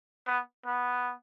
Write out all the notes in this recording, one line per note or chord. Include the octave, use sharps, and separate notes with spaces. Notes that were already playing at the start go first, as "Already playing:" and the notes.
B3
B3